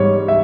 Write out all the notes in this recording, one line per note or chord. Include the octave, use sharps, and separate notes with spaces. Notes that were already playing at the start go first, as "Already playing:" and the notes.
Already playing: G#2 G3 C#5
E5